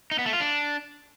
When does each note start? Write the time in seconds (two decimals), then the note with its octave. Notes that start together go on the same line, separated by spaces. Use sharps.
0.11 D#4
0.19 B3
0.26 A3
0.33 F4
0.40 D4